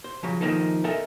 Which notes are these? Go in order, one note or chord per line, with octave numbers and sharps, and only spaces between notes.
C5
C#3 F3 F#3
D#3 F3 A#3 D#4 G#4 A4
A4 A#4 D#5 E5 G#5 A5